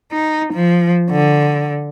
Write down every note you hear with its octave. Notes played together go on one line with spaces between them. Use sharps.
D#4
F3
D3